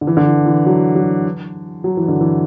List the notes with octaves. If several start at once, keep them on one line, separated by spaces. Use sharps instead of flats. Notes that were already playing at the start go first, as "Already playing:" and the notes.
D3
E3
D3
E3
E3
F#3
F#3
F#3
E3
D3
E3